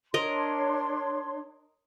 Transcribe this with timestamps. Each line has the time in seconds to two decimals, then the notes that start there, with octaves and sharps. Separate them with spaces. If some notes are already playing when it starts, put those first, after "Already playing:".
0.14 D4 A#4 C#5 D#5 C6